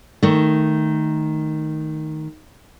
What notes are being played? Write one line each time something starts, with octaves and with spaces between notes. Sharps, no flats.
D#3 A3